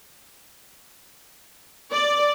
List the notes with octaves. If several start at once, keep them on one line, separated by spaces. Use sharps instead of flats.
D5